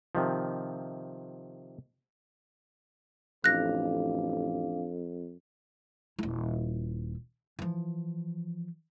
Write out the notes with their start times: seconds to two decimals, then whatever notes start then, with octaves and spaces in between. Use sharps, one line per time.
0.15 C3 D#3 F3
3.44 A1 F2 D4 F5 F#6 A#6
6.19 D#1 E4
7.59 E3 F3